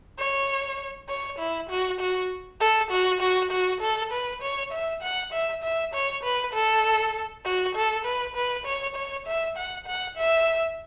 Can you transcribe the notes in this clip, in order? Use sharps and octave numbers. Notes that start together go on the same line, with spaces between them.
C#5
C#5
E4
F#4
F#4
A4
F#4
F#4
F#4
A4
B4
C#5
E5
F#5
E5
E5
C#5
B4
A4
F#4
A4
B4
B4
C#5
C#5
E5
F#5
F#5
E5